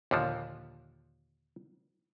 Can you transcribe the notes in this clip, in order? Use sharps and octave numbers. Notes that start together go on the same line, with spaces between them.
D#2 A#2 D3 F3